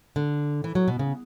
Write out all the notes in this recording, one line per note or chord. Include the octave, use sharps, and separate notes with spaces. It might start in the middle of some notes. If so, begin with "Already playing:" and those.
D3
E3
F#3
B2
C#3